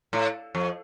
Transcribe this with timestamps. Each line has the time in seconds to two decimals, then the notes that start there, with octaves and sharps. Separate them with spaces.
0.13 A2
0.55 F2